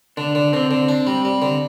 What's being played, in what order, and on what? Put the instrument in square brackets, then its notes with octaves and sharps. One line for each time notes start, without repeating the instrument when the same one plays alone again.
[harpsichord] D3 [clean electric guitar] D4
[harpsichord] D3
[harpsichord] D3 [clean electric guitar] C4
[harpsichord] D3
D4
G3
G3
D3